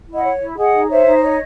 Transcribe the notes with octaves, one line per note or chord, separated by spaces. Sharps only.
E4 D#5 F#5
C#5
E4
G#4 D#5 F#5
D#4
C5 C#5 E5
D#4
C#5 D#5